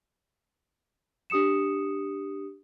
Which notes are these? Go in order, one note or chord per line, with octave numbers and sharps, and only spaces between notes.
D4 G4 D#6 C#7 E7